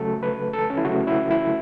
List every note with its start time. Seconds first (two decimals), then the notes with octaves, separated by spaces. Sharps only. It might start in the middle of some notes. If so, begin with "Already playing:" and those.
Already playing: C#3 F#3 A3 A4
0.23 B4
0.53 A4
0.70 C#4
0.78 E4
0.85 C#3 F#3 A3 F#4
1.07 E4
1.31 E4